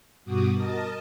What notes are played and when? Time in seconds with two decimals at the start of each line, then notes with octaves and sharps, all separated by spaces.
0.24 G2 B2 F#4 D6 D#6
0.54 A#4 D#5 A5